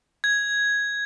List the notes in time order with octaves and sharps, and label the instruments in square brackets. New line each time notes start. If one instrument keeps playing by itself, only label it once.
[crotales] G#6